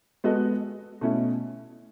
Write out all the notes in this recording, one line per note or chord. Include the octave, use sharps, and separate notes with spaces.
G#3 B3 F#4 A4 D#5
B2 A3 C#4 E4